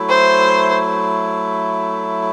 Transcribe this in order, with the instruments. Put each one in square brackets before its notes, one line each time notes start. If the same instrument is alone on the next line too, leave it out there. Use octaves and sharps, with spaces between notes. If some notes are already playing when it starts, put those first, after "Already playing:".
Already playing: [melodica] F#3 A3 E4
[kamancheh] C5